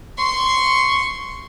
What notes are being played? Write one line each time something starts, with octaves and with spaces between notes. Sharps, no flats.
C6 C#6